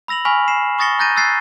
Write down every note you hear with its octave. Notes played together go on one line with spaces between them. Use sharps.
B5 E6 A#6 F7 F#7
G#5 B5 C#6 F6 B6
C7 E7
C#6 D#6 A6 A#6 C#7 G7
A#5 F#6 G6 A6 A#6 D#7
E6 F#6 A6 C7 C#7